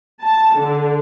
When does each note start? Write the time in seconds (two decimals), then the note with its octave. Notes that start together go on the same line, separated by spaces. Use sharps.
0.22 A5
0.55 D3